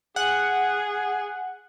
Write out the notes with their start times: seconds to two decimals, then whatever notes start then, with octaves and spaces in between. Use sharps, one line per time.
0.16 G#4 F#5